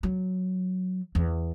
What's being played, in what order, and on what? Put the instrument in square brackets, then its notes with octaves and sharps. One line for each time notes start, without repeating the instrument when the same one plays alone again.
[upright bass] F#3
E2